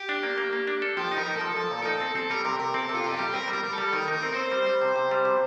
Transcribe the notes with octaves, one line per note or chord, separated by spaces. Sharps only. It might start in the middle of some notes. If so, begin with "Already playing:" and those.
Already playing: G4
D4
A#3
A#3
A#3
D4
A4
F3 G4
D#4 A#4
D#4
F3 A4
F3 A4
A#2
A#4
D#4 A4
C4
C4 A4
G3 A#4
C3 A#4
C3 A#4
C4 A4
C3 F4
C3 A4
G3 G4
C4 A#4
G3
A#4
G3 A#4
A4
G3
D#3 A#4
D#4 A#4
C4
C4 C5
G3
G3
C3
C3
G3
C3